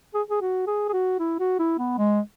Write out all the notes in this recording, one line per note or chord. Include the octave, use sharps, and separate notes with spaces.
G#4
G#4
F#4
G#4
G#4
F#4
E4
F#4
E4
B3
G#3